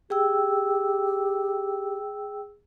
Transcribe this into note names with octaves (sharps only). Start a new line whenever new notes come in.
G4 G#4 G5 E6